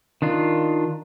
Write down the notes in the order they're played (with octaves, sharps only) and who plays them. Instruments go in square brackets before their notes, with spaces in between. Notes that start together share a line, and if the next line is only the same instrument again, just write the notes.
[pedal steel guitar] D#3 D4 F4